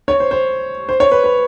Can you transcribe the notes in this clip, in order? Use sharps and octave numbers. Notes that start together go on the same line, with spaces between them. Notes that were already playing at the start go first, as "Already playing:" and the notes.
C#5
C5
C5
C5
C#5
B4
B4